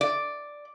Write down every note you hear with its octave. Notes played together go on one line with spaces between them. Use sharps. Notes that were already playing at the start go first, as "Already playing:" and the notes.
D5